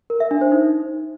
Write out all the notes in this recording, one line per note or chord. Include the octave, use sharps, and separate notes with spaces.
A#4
E5
D4
C5
D#4